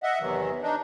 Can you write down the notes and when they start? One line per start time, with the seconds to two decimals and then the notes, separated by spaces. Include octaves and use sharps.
0.03 D#5 E5 F#5
0.20 E2 C3 D#3 E3 F#3
0.62 D4 D#4